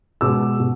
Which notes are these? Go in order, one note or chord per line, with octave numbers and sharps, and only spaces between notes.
B2 G#3 D6 E6
B2